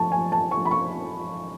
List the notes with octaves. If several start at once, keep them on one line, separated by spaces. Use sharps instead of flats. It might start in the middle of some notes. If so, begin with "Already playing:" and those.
Already playing: F3 A5 C#6
G#5
A5
C#6
B5
C#6